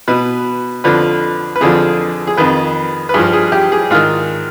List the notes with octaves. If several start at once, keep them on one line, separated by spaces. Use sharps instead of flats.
B2 B4
F2 D3 F3 B4
B4
F2 D3 F3 G#4
G#4
F2 D#3 B4
B4
G2 F3 G#4
G#4
G4
G#4
G#2 D#3 F4